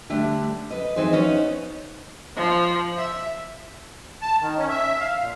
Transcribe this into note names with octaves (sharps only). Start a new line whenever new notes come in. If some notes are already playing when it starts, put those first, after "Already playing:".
D3 G3 A3 D4
B4 D#5
E3 C4 D#4 G#4 C5
B3 C#4 D#4
F3
E5
A5
D#3
C#4
E5
F5
A#2